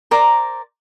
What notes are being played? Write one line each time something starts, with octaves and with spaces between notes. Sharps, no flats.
A#4 C5 D5 A#5